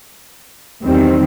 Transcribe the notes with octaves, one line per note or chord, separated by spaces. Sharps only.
E2 D#3 G3 C4